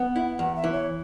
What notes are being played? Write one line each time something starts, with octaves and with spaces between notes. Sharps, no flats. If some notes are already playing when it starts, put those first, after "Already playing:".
Already playing: B3 F#5
E4
E2 F#5
E5
E3
C#5